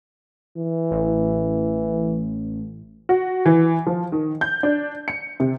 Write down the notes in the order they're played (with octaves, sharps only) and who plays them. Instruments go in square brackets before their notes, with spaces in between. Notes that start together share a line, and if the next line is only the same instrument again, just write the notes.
[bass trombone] E3
[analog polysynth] A1
[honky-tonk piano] F#4
E3
F3
D#3
G6
D4
C#7
C3